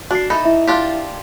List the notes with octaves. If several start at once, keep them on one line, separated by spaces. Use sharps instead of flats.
D4 F#4 C7
E3 D#4 A4 B5
E4 E5
D4 F4 G4